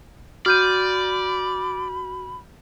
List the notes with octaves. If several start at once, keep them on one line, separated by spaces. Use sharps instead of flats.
F#4 D5 B5 F6 G6 D#7